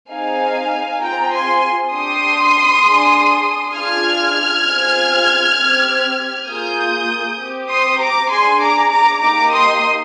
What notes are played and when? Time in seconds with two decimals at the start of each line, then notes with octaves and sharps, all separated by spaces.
0.11 C4 D#4 G#4 F5 G#5
1.02 C4 F4 G#4 G5 A#5
1.33 G#5 C6
1.93 D4 G4 C6 D#6
2.85 D4 G#4
3.75 D4 F4 G#4 F6 G#6
4.67 C4 F4 G#4
5.58 C4 G4
6.49 A#3 F4 G#4 D#6 G6
7.40 C4 G4
7.70 C6 D#6
8.01 A#5 D6
8.31 D4 G#4 G#5 C6
8.62 A#5 D6
8.92 A#5 D6
9.22 A#3 D#4 G4 A#5 D6
9.52 C6 D#6